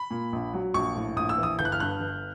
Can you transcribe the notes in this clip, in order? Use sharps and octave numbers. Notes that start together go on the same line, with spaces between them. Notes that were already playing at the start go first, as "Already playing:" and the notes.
Already playing: B5
A#2
A#1
F#3
A#1 C#6
A2
A#1 D#6
E6
E3
D#6
G1 G6
F#6
F6
G2 F#6
G1